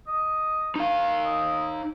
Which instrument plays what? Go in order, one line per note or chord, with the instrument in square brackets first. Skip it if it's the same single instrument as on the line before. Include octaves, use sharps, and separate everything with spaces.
[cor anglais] D#5
[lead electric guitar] D#4 F5
[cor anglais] D#5